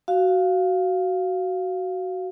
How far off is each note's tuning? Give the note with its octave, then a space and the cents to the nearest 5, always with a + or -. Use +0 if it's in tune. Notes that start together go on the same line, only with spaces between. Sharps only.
F#4 +10 F5 +0